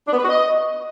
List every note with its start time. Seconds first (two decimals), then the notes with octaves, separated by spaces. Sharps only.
0.08 D4
0.13 B3
0.18 B4
0.24 F#4
0.29 D#5